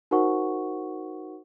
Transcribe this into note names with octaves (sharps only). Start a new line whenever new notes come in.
D#4 F#4 A#4 C5 F#5 C#6